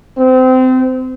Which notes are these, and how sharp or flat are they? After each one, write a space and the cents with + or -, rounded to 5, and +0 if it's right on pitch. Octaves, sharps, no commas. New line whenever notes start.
C4 -25